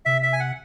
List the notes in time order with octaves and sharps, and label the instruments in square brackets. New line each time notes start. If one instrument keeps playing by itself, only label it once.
[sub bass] C3 [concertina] E5
[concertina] E5
G#5
F#5